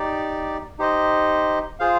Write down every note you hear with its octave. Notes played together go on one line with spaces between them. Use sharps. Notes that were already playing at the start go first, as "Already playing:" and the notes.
Already playing: D#4 G4 D5
D#4 G4 C5 D#5
F4 G#4 C5 F5